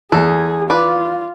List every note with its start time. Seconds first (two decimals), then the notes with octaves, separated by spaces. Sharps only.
0.12 E2 G#4 A4
0.70 F4 B4 D5